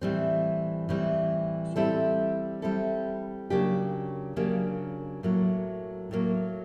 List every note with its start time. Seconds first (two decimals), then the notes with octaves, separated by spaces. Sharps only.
0.01 A2 E3 G3 C4
0.89 A2 E3 G3 C4
1.76 G3 C4 E4 A4
2.62 G3 C4 E4 A4
3.50 C#3 F#3 A#3 D4 G4
4.36 C#3 F#3 A#3 D4 G4
5.23 A2 F#3 A#3
6.11 A2 F#3 A#3